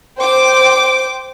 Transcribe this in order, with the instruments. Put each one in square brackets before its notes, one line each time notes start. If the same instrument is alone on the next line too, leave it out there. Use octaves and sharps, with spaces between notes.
[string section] C5 G5 D6